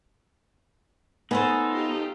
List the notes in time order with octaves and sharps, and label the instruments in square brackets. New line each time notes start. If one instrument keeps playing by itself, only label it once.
[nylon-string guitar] B3 [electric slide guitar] D#4 [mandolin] G#4 A4 C5
[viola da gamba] F4 G4